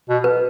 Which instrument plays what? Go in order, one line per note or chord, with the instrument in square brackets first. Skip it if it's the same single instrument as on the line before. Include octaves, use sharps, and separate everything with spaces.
[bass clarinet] B2
[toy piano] B4